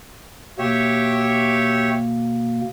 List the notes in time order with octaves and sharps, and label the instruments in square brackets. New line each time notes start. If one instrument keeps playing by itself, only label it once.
[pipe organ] B2 A#3 [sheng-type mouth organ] G4 C#5 E5